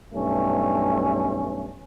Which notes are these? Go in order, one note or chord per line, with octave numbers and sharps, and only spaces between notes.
B1 G2 A3 C#4